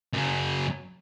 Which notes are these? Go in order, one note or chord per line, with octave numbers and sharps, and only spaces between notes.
F#2 C#3